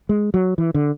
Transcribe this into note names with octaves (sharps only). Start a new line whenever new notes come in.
G#3
F#3
E3
D3